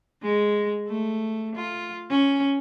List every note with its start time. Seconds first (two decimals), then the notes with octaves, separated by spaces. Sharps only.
0.23 G#3
0.88 A3
1.56 F4
2.11 C#4